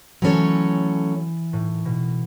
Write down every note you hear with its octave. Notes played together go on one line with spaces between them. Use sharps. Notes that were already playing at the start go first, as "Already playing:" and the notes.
E3 F#3 A3 C#4 A4 C#5
A2
B2